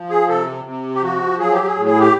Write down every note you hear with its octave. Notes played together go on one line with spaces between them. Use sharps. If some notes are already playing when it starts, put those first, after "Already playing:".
Already playing: F3
G#4
C3 A4
C3
G4
F3 F#4
F#3 G#4
G4
G#4
A2
G#4
G4